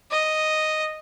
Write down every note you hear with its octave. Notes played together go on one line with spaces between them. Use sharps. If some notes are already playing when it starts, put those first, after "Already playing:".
D#5